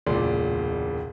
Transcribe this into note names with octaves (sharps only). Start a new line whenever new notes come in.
E1 C#2 A#2 D5 C6